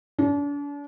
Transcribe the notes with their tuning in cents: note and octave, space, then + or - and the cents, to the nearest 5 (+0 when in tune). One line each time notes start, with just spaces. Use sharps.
D4 -40